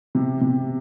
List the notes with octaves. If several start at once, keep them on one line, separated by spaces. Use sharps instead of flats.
C3
C3